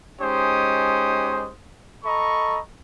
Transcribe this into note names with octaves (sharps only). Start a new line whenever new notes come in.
G#3 C#4 D#4 G4 C5 D#6
A4 D#5 A#5 B5 C#6